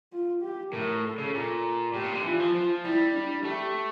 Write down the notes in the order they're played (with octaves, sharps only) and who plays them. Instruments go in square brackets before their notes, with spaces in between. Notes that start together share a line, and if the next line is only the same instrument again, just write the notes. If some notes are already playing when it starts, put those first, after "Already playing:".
[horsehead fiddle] F4
G4
[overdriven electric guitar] A2 [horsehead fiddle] A#4
[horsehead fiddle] A4
[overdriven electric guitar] C#3
A#2
[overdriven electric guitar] A2 [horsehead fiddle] G4
[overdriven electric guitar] A#2
D3
[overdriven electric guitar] E3 [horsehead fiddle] F4
[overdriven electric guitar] F3
F3
[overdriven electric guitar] G3 [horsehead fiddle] E4
[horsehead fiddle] D4
[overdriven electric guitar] A3 [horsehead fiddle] G4